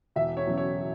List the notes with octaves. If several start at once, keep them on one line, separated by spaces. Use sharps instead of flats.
E1 E5
C#5
E2 C#3 F#3
C#5